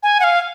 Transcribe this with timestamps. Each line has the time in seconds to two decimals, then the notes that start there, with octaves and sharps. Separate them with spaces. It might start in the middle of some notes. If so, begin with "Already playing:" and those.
0.03 G#5
0.20 F#5
0.24 F5